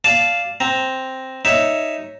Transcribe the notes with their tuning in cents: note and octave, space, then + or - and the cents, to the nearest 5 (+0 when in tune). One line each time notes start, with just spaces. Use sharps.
D5 +0 F5 -5 A5 -15
C4 +0 A#5 +0
D#4 +0 C#5 +0 E5 +0